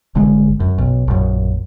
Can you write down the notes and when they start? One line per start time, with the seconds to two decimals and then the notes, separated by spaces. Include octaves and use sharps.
0.15 G1 D3 G#3
0.60 F#2
0.78 B1
1.08 A#1 F#2